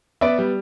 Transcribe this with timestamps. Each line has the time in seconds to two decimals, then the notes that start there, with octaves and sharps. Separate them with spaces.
0.21 B3 D5 E5
0.38 G3